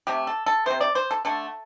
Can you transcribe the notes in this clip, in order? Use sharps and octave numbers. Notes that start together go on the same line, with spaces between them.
C3 A3 G4
A4
A4
C3 A3 C5
D5
C5
A4
D3 A3 A4